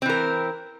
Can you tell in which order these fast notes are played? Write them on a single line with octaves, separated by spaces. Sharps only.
C4 E3 A#4